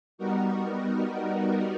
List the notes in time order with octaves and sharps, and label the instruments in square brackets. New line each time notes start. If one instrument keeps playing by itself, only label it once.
[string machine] G3 B3 D#4 F#4 A#4